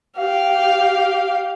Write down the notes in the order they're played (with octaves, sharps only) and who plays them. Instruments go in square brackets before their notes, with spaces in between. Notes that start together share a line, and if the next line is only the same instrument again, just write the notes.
[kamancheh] G4 F5